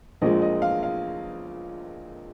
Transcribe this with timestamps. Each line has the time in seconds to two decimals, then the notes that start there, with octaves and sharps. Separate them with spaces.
0.22 A#1 A#2 G#3 D#5
0.42 D#5
0.62 F5
0.83 F5